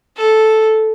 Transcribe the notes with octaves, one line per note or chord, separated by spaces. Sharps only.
A4